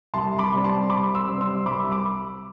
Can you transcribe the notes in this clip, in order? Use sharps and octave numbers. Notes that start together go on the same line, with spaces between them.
C2 A5 C6
B5 D6
C3 G3 C4
A5 C6
C2 B5 D6
C6 E6
C3 G3 C4
C6 E6
C2 B5 D6
B5 D6